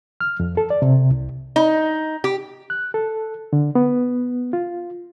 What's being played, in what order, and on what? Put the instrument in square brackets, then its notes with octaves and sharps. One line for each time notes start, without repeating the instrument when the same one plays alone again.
[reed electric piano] F6
F2
A4
D5
C3
C2
[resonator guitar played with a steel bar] D#4
G4
[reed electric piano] F#6
A4
D3
B3
F4